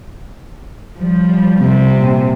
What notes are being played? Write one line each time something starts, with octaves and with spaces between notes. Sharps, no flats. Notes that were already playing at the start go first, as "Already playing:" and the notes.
F3 G3
C3
A#2